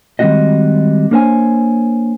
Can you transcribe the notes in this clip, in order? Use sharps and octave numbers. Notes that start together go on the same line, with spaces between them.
D#3 G3 G#3 C4 F#4 D#5
A#3 D4 A#4 C5 C#5 G#5